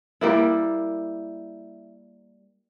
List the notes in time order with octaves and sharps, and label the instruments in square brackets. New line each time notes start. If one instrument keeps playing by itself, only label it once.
[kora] G3 A#3 E4